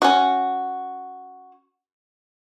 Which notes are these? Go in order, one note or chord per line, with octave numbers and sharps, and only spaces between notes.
C#4 F#4